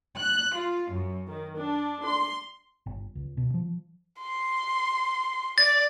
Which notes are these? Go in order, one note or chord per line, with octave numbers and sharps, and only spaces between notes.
F#6
F4
F#2
D#3
D4
C6
G1
C#2
B2
F3
C6
D5 A6